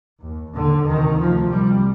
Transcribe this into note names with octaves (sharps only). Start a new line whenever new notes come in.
D#2
D#2 D3
D2 C3 D#3
D2 C3 F3
C2 C3 G3